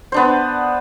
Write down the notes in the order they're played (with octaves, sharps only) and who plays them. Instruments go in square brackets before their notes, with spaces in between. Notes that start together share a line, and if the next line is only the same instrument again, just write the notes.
[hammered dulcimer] B3 D4 C5